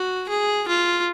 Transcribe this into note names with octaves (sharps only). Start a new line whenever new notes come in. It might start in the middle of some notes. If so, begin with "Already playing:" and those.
Already playing: F#4
G#4
F4